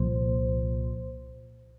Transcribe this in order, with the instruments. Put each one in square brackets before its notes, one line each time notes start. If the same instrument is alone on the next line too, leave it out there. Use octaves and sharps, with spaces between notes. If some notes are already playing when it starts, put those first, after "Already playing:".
Already playing: [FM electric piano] C2 A#2 F3 C5